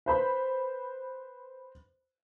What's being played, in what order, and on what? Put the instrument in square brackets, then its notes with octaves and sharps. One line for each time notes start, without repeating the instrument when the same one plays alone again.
[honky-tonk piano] B4 C5 B5